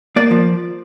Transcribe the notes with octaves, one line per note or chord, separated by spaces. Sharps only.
A#3 D5
F3